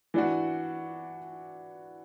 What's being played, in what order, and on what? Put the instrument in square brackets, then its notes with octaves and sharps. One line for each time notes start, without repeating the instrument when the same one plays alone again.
[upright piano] E3 D4 F#4